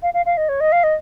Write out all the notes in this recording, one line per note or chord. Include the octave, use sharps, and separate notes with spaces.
F5
F5
F5
D#5
C#5
D#5
F5
D#5